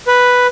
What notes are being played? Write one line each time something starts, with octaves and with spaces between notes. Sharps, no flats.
B4